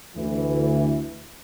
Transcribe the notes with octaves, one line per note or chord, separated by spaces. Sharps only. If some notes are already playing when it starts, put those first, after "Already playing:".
D2 E3